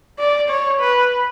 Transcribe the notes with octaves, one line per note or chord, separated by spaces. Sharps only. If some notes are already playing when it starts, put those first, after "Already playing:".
D5
C#5
B4